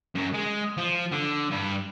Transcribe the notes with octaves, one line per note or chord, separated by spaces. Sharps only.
F#2 F#3
G#3
F3
D3
G2 B4